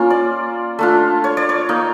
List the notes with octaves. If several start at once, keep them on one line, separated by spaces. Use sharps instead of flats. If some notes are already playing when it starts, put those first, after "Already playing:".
Already playing: A#3 C#4 F4
D5
A3 D4 F4
C#5
D5
C#5
A#3 D#4